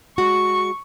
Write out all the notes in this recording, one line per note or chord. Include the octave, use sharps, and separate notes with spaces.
G#3 F#4 C#6